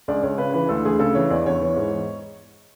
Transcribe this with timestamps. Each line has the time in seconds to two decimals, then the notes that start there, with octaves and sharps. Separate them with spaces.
0.08 C#2 D5
0.23 C#2 C#5
0.38 C#3 B4
0.54 E3 B4
0.69 D2 A4
0.85 D2 G#4
0.99 C#3 A4
1.15 E3 C#5
1.30 E2 D5
1.46 E2 C#5
1.61 E3
1.76 G#2